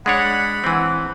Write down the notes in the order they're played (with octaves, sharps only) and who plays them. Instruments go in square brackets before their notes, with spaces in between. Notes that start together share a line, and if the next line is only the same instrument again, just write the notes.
[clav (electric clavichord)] G#3 D4 C#5 [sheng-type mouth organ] F#5 B5
[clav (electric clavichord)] E3 C4